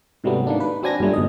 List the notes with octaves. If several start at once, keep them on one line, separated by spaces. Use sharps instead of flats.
G#2 C3 F#3 G3 A3 B3
D#3 A#3 D4
B4
F#3 C4 D4 G#5 G#6 A#6
G2 A#2 G3 A3
G1 G#2 B2 D#5